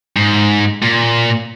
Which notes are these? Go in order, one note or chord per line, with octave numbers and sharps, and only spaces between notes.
G#2
A#2